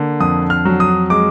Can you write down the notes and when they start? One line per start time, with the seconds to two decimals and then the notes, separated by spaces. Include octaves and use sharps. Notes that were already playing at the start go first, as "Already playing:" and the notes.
Already playing: D3 A#3
0.20 F2 D#6
0.50 F6
0.65 F#3
0.80 D#6
1.10 G#3 D6